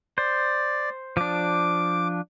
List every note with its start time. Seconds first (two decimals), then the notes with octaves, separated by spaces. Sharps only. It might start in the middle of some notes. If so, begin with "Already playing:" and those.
0.18 C5 D5
1.17 F3 D4 D6